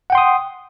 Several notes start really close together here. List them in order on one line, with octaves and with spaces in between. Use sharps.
F#5 G5 C6 D#6